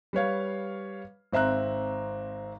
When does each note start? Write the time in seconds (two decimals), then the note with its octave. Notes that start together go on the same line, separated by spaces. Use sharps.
0.13 G3 B4 C#5 F5
1.32 G#1 C4 E5 A#5 F#6